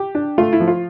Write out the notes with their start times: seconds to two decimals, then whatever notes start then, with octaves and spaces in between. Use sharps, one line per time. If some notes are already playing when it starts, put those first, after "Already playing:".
Already playing: G4
0.15 D4
0.38 A3 F4
0.53 E4
0.60 F3
0.68 F4